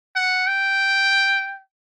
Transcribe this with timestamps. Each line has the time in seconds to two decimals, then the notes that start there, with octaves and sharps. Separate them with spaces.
0.16 F#5
0.47 G5